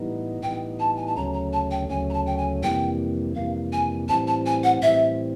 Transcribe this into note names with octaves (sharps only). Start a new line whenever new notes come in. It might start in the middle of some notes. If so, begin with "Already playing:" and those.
Already playing: A2 E3 G3 B3 D#4
A2 E3 G3 B3 D#4 G5
A5
G#5
A5
D2 C#3 F#3 A3 C#4 A#5
A#5
A5
G5
D2 C#3 F#3 A3 C#4 G#5
A#5
A5
G5
G#5
F2 C3 E3 G3 A#3 G5
F2 C3 E3 G3 A#3 F5
G#5
A2 E3 G3 C4 A5
A5
G#5
F#5
A2 E3 G3 C4 E5